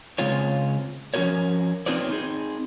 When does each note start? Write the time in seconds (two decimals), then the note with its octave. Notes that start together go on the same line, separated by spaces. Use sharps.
0.18 C#3 G#3 C4 F4 C#5
1.14 F3 C#4 E4 F#4 A#4 C#5
1.86 C4 D#4 F4 B4 C#5 D5
2.09 C4 D#4 G#4